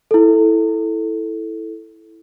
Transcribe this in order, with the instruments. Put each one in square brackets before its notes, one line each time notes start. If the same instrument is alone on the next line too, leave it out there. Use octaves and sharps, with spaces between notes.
[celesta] E4 A4